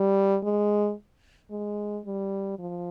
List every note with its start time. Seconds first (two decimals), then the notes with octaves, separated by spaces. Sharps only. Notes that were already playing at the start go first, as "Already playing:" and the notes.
Already playing: G3
0.44 G#3
1.51 G#3
2.06 G3
2.59 F3